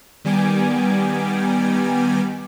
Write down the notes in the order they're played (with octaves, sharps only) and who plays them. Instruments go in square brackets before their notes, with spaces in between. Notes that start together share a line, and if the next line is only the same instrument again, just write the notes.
[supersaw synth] D#3 G3 B3 G#5 D6